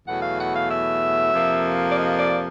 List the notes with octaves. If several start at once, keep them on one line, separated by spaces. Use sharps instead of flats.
E2 B2 F#3 A3 F#5
F5
F#5
F5
E5
F2 C3 F3 A#3
D5
D#5
D5